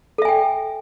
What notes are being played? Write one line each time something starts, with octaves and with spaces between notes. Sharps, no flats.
A4 E5 G5 G#5